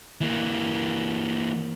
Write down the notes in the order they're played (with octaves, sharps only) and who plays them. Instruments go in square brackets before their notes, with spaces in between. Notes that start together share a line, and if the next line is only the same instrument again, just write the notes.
[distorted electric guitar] E3 A#3